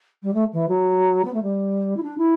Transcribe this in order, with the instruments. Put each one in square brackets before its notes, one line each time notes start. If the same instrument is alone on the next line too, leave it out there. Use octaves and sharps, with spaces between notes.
[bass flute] G3
A3
E3
F#3
B3
A3
G3
E4
D4
E4